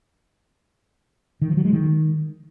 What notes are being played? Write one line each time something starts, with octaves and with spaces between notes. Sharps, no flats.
D#3
F3
F#3
G#3
D#3